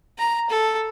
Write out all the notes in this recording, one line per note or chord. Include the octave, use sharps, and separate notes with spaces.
A#5
A4